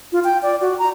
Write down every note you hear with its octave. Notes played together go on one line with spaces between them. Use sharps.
F4
G5
D5
F#4
A#5